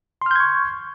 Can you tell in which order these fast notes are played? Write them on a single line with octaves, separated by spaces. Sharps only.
C6 F6 G6 G#6 C#6